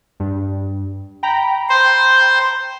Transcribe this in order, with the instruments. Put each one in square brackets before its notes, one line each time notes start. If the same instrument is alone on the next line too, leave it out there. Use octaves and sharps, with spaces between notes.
[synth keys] G2
G5 A#5 B5
[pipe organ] C5